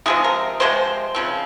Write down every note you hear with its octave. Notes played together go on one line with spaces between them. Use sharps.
C3 F3 G#3 C4 G#4
A#4
C3 F3 G#3 C4 C5
C#3 F3 C4